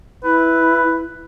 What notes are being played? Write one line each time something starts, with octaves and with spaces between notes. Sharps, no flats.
E4 B4